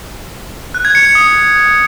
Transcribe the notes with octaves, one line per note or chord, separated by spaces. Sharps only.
F#6
G#6
C#7
C#7
D#6